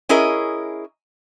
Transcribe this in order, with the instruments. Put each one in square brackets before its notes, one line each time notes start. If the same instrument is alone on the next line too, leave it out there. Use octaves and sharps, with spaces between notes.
[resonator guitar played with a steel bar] C#4 E4 G#4 A#4 D#5